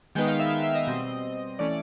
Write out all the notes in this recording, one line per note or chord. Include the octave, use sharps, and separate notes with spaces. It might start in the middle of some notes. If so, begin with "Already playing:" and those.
D#3 G#3 B3 D#4 G5
F5
E5
E5
D#5
B2 G3 C4 D#5
E3 A3 C#4 D5